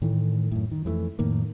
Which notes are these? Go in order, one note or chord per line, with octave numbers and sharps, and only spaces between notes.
A2 D#3 E3 A3
F#2 A2
D#3
F2 E3 G#3 A3
F2 A2 D#3 A#3